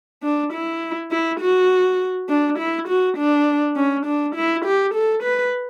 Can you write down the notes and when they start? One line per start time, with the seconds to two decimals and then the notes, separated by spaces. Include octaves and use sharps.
0.23 D4
0.53 E4
1.11 E4
1.40 F#4
2.29 D4
2.58 E4
2.88 F#4
3.17 D4
3.76 C#4
4.06 D4
4.35 E4
4.65 G4
4.94 A4
5.23 B4